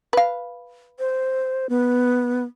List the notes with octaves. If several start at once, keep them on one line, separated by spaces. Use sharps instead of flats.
B4 F5
C5
B3